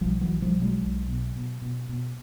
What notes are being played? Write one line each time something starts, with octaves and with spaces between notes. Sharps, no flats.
B1 F3 G3
E3 F#3
B1
F3 G3
B2
F#3 G#3
B1
B2
B2
B2
B2